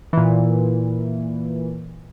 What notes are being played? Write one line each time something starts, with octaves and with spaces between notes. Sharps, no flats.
A#2 E3